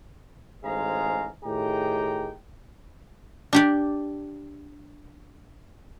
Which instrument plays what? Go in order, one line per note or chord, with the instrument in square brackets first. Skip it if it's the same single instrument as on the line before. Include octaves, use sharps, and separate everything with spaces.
[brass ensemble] A1 G#2 G#4 C5 F5 A#5
A2 D#3 G4 G#4 G5 A#5
[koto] D4 G4 D5